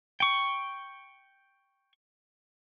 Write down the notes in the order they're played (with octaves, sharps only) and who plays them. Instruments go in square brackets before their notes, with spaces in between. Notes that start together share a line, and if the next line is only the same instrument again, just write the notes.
[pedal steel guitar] G5 C#6